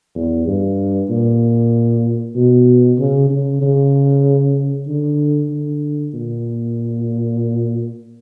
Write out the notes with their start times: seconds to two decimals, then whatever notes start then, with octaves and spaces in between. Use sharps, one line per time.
0.15 E2
0.47 G2
1.09 A#2
2.36 B2
2.99 C#3
3.30 C#3
3.62 C#3
4.87 D3
5.50 D3
6.14 A#2